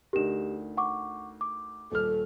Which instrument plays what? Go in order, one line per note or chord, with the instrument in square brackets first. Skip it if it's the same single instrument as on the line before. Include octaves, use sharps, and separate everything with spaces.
[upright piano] D2 D#4 A#4 [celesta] G4 E7
[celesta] F#5 C#6 D6
D6
[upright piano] D#1 F6 [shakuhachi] A4